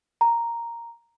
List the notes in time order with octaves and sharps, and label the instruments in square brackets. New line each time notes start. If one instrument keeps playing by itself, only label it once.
[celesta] A#5